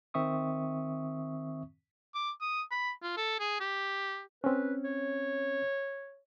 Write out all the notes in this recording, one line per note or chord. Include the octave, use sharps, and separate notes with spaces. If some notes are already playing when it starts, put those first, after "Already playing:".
D#3 C4 E5 C#6 D#6
D6
D#6
B5
F4
A4
G#4
G4
C4 C#4 B4
C#5